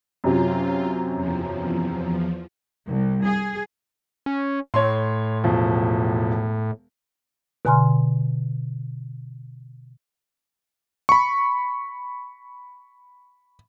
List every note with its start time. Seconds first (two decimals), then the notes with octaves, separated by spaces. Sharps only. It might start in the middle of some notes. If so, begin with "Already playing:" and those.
0.24 F#2 C3 F#3 F4
1.13 E2 F3
2.87 C2
3.25 G#4
4.26 C#4
4.74 A2 C#5 C6
5.44 E1 F3
7.65 B2 D3 G#5 A#5 C6 F6
11.09 B5 C#6